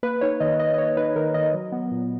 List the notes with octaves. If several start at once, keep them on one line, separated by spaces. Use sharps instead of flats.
A#3 B4
D#4 C#5
D#3 D#5
D#3 D#5
D#5
A#3 C#5
D#4 B4
D#3 A#4
D#3 D#5
F#3
B3
A#2